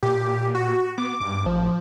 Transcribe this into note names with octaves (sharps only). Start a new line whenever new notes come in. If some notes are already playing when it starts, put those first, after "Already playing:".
A#2 G4
F#4
B3 D6
G2 D6
A1 F3